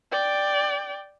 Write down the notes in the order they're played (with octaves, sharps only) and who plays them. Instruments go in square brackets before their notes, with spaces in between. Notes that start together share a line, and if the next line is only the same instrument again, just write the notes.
[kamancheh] D5 G5